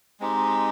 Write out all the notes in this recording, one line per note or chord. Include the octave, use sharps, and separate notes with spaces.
G#3 C4 D#4 G4